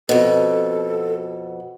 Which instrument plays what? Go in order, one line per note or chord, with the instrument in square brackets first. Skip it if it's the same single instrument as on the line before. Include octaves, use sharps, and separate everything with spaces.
[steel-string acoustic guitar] F2 B2 [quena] A4